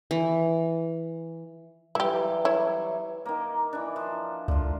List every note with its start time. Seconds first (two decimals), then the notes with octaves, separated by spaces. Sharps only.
0.11 E3
1.95 E3 F#3 G3 E4 G4
2.45 E4 C#5
3.25 D#3 A#3
3.73 E3 D4
3.96 F3
4.48 C#2 D3 F4